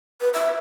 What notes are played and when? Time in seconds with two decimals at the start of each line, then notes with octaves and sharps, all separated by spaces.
0.21 B4
0.34 E5